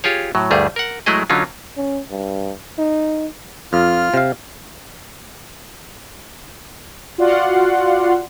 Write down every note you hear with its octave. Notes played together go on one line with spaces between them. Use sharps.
F4 G4 G#4 C#5
A2 F#3
D2 G2 G3 A3 G#4
A#4 F#5
F#3 G#3 A3 E4 G#4 D#5
D3 F#3 C#4 D#4 F4
C#4
G2
D#4
F2 F4 F6
C3 F5
F4 F#4 D5 F5 F#5 C6